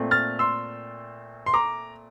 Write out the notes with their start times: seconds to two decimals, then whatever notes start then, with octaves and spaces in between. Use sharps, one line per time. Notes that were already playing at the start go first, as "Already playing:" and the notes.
Already playing: A#2 A3 C4
0.11 F6 A6
0.39 C6 E6
1.46 C6
1.54 A#5 D6